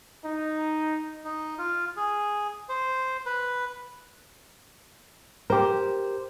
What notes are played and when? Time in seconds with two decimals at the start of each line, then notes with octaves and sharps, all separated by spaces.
0.24 D#4
1.25 D#4
1.58 F4
1.97 G#4
2.69 C5
3.26 B4
5.50 G4 A#4 C5